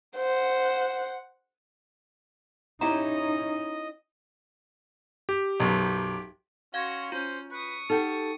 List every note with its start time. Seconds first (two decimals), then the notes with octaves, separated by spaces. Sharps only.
0.17 C5 F#5
2.81 C#4 D#4 E4 G4 D#5 A#5
5.29 G4
5.60 B1 F#2
6.74 C#4 F#4 F5 C6 G#6 A#6
7.12 C#4 F4 C5 G6
7.52 B4 C#6 D#6
7.90 D#4 G4 A4 F#5 A5